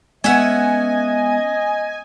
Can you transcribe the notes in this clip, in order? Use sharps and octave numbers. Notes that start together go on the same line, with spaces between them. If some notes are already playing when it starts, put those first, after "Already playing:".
G#3 B3 C#4 D#5 E5 F#5 G#5